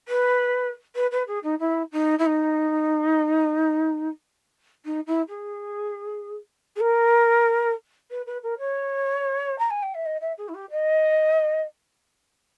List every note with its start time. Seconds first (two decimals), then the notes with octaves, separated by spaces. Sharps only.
0.08 B4
0.95 B4
1.12 B4
1.27 G#4
1.43 D#4
1.60 E4
1.92 D#4
2.19 E4
2.26 D#4
4.85 D#4
5.07 E4
5.28 G#4
6.76 G#4
6.80 A#4
8.11 B4
8.27 B4
8.43 A#4
8.59 C#5
9.59 A#5
9.70 G#5
9.83 G5
9.94 E5
10.06 D#5
10.21 E5
10.38 G#4
10.48 E4
10.54 G4
10.71 D#5